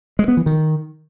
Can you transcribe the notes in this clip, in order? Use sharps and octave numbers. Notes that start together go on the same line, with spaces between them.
G#3
B3
E3
D#3